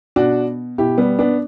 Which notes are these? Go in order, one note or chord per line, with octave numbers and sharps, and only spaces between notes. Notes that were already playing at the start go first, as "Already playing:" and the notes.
B2 D4 F#4
B2 E4 G4
G3 B3
B3 D4